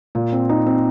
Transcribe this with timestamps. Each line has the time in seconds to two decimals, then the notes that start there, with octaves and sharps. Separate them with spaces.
0.15 A#2
0.32 C4
0.49 D#4
0.67 C4